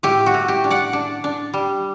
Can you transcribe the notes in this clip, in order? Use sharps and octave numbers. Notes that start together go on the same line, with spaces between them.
A2 G4
F#4
A2
G4
D4
D5 F#5
D4
D4
G3